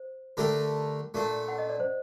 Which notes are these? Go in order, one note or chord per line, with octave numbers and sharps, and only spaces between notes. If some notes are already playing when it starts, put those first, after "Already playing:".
Already playing: C5
D3 A3 D4 G4 A#4
A#2 A3 D4
F#5
D#5
D5
C5